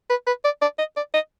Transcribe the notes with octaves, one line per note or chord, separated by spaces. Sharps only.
B4
B4
D5
D5
D#5
D5
D#5